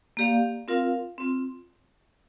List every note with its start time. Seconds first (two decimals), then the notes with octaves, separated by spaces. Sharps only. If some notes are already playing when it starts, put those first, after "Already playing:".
0.17 A#3 G4 D5 F5
0.68 C4 F4 A#4 F5
1.18 C4 F4